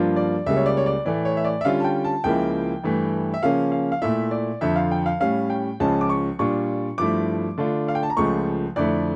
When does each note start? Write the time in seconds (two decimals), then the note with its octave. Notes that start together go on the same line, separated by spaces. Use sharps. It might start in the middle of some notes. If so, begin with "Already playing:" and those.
Already playing: G2 F3 A#3 D4 F4
0.16 D5
0.46 C#2 C#3 G3 A#3 E5
0.56 C#5
0.66 D5
0.77 C#5
0.86 D5
1.05 A2 E3 A3 D5
1.25 C#5
1.37 E5
1.45 D5
1.61 E5
1.65 D3 G3 C#4 F4 F5
1.80 A5
1.84 G5
2.04 A5
2.24 C#2 C#3 F3 A#3 E4 G5
2.84 G2 E3 A3
3.34 E5
3.43 C#3 F3 A#3 C#4 F5
3.72 F5
3.92 F5
4.02 A#2 A3 E4 E5
4.31 D5
4.61 F2 D3 F3 E5
4.76 F5
4.91 G5
5.06 F5
5.20 A2 G3 C#4 F5
5.50 G5
5.80 C#2 C#3 F3 C#4 A5
6.01 D6
6.10 C#6
6.39 A#2 G3 D4 F4 C#6
6.98 G2 F3 A3 E4 D6
7.58 D3 A3 D4 F4
7.88 F5
7.95 G5
8.03 A5
8.10 A#5
8.17 C#2 C#3 F3 A3 C#6
8.76 F2 D3 A3 E4 D5